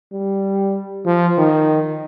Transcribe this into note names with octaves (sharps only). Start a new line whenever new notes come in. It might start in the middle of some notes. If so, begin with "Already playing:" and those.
G3
F3
D#3